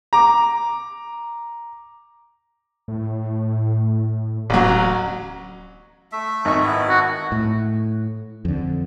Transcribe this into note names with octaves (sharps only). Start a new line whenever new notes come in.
A#5 D6
A2
D1 A1 F#3
A3 E5
G#1 D#5 C#6
B3 E4
F#4
A2
F2 D3